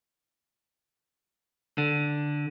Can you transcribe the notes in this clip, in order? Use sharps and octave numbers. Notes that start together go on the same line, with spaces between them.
D3